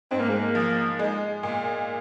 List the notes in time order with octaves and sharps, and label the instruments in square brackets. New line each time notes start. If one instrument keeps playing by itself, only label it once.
[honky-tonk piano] G#2 [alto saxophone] C4
[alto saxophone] A#3
G#3
A#3
[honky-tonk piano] F3
G#3
A#2